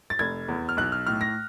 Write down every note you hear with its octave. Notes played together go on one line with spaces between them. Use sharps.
A6
F1 G#6
E2
F6
B1 F#6
F6
A2 F6
A#6